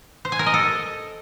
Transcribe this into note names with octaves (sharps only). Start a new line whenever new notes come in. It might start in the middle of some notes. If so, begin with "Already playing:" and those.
C5
G#5
A#4
D#5
A4